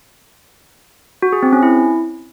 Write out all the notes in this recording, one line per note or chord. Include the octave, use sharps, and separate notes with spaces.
F#4
G#4
C4
C#4
E4